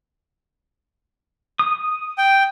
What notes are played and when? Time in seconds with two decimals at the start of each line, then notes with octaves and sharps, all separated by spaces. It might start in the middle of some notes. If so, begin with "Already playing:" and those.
1.59 D#6
2.18 G5